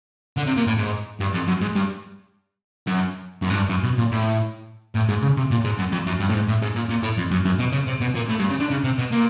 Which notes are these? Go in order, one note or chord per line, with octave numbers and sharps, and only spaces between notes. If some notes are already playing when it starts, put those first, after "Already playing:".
D3
C3
A#2
A2
G#2
G2
F2
F#2
G#2
G2
F#2
F#2
G#2
G2
F#2
B2
A#2
A2
A2
G#2
C#3
C3
A#2
G#2
F#2
F2
F#2
G2
A2
G#2
A2
G#2
A#2
A#2
A2
F2
F#2
F#2
B2
C#3
C3
B2
A#2
A2
G2
C#3
D3
C#3
C3
B2
A#2